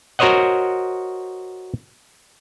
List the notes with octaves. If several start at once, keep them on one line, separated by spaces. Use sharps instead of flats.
F#4 A#4 C5 C#5 D#5 F#5